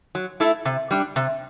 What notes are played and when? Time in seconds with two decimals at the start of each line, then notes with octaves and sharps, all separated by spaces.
0.15 F#3
0.40 A3 E4 A4
0.65 C3
0.91 G3 D4
1.16 C3